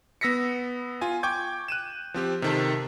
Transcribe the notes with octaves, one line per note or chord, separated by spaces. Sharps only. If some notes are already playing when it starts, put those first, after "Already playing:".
B3 E6 A#6 B6 C#7
F4 G#5
G5 C#6 D6 G6 G#6
F#6 D#7 E7
F3 C4 G4
C3 D#3 A4